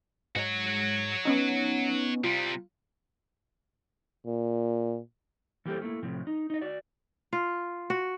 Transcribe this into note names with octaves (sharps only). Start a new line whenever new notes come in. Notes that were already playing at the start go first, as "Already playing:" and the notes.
G#2 G#3 F#4 C#5
B3 C#4 D#4
C3 G3 F4
A#2
E3 G3 A#3 G4 A4 C5
A3 A#3 E4
A2 C3 F3
D#4
D#4 D#5
F#4 D5
F4
F#4